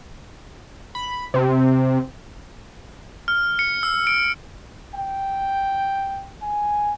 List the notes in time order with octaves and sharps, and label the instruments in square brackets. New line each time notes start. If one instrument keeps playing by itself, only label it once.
[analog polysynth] B5
C3
[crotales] F6
C#7
E6
D7
[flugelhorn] G5
G#5